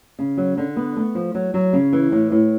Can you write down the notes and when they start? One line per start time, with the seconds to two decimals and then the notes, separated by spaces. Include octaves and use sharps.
0.19 C#3
0.38 F#3
0.57 D3
0.76 B3
0.96 A3
1.15 F3
1.35 F#3
1.54 F#3
1.73 C#3
1.93 E3
2.12 A2
2.32 A2